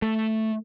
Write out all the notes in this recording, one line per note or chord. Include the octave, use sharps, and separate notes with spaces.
A3